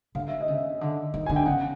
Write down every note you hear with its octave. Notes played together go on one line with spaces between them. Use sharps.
D3 F5
E5
D#5
C#3
E5
D3
D#3
D3 G#5
G5
C#3 F#5